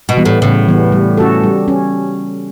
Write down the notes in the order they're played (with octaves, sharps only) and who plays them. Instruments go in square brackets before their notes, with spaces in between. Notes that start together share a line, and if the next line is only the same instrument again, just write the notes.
[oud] B2
[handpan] E3 G3 B3
[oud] A2
[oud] A2 [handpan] C#3
[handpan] E3 G3 B3
G3
C#4 F#4 A4
G3
C#4